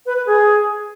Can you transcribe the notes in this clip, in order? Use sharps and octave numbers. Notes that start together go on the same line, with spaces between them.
B4
B4
G#4